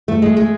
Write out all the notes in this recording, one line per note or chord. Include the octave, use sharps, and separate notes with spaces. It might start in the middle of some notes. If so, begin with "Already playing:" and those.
A3
G#3
G#3